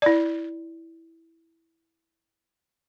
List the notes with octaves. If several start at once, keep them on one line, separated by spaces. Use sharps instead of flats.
E4 D5